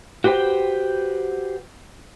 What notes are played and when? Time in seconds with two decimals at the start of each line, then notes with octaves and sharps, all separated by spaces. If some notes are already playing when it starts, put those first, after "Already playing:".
0.24 F#4 G4 B4 C5 G5